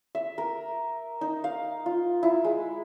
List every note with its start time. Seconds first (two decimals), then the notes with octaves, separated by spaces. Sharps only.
0.15 E5
0.38 A#4
1.21 D#4
1.44 F5
1.86 F4
2.23 E4
2.44 G#3